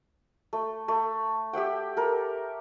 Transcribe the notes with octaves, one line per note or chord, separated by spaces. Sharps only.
A3
A3
G4 E5 F#5 G5
A4 A#4